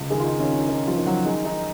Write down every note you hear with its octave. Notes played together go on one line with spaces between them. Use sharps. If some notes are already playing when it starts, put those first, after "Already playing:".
Already playing: C#2
D#3 G#3 G#4
F4
D#4
D#3 C#4
C#4
D#3 D#4
F3 F4
D#3
F#3 F#4
G#3 D#4
D#4